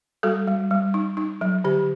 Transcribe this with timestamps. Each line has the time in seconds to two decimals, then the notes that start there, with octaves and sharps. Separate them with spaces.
0.23 G3 F#4 A4
0.47 G3
0.71 G3
0.94 D#4
1.17 D#4
1.41 F#3
1.64 D3 G4